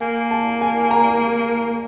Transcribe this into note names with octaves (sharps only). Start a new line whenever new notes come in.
A#3 G#5
A5
G#5
A#5